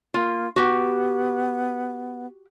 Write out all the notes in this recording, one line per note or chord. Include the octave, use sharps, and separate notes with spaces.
A#3 F4
B3 F#4 G4